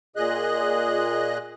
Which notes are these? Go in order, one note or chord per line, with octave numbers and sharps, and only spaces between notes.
A#2 G#4 D#5 F#6